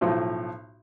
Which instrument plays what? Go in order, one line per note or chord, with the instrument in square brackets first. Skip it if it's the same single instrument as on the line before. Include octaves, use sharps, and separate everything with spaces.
[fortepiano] B1 A2 F3